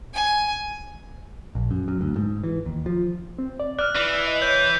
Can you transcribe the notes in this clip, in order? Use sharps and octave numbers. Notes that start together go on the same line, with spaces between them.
G#5
A#1
F#2
F#2
D2
G#2
E3
D#2
F3
C4
D5
D5 F6 F#6
E3
D#5
C#5 G6